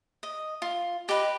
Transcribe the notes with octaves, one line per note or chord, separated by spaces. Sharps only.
D#5
F4
G4 B4 D#5